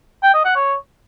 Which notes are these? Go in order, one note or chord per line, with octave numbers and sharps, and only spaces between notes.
G5
D#5
F#5
C#5